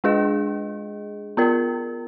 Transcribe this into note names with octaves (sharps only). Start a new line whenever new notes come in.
G#3 D4 G#4 D#5
B3 F4 A#4